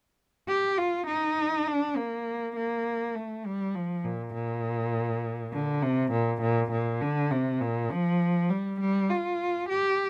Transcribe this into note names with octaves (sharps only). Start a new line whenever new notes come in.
G4
F4
D#4
D4
A#3
A#3
A3
G3
F3
A#2
A#2
D3
C3
A#2
A#2
A#2
D3
C3
A#2
F3
G3
G3
F4
G4